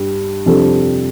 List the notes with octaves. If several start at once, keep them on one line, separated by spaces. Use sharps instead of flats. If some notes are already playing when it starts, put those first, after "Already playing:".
Already playing: G2 G3
F2 C3 G3 D4 A4